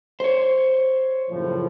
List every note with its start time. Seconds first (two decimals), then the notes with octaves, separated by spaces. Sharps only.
0.20 C5 C#5
1.30 F#1 A2 F3